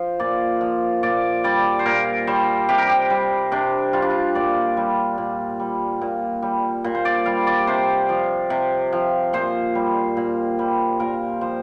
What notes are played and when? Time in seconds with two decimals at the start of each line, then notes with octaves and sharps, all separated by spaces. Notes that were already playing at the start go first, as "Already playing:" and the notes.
Already playing: F3 C5
0.19 A#2 D5
0.61 F3
1.03 A#2 D5
1.44 G3 D5
1.79 C5
1.85 A#2 A#4
2.27 G3 C5
2.69 C3 G4
2.78 A#4
2.87 G4
3.10 G3
3.52 C3 D4
3.93 G3 F4
4.02 D4
4.10 F4
4.35 A#2 D5
4.77 G3
5.18 A#2
5.60 G3
6.01 A#2
6.42 G3
6.84 A#2
6.95 C5
7.05 D5
7.26 G3 F5
7.47 D5
7.67 C3 C5
8.09 F3
8.50 C3
8.92 F3
9.33 A#2 C5
9.75 G3
10.17 A#2
10.59 G3
11.00 A#2 A#4
11.41 F3 C5